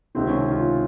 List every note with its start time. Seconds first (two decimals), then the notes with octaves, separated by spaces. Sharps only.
0.15 C#2 C3 D#3 C4
0.27 C#4
0.52 F4